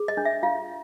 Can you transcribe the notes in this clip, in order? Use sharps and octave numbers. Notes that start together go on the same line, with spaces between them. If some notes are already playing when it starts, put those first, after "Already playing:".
Already playing: G#4
D#5
D4
E5
F4 F5